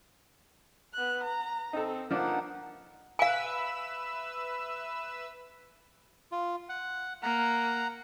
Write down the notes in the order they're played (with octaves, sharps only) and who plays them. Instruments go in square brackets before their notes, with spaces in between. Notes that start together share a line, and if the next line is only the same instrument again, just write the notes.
[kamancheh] B3 F#6
A#5
[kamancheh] C4 [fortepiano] D#4 A4
[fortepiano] F3 D4 [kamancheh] A#3 A4 [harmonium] B3 D#4 F#5
[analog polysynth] B4 E5 E6 [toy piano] F5 G#5
[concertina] F4
F#5
[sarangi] A#3 [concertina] F#5 A#5